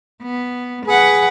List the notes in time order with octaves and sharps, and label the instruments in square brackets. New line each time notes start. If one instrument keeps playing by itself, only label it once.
[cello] B3
[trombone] G#4 [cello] B4 F#5